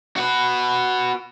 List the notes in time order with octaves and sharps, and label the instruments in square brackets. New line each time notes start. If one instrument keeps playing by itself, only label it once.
[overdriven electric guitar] F#4 B4